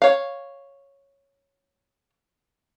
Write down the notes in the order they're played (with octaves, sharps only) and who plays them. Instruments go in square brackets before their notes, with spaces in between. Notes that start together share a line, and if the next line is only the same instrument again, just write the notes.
[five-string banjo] C#5 F5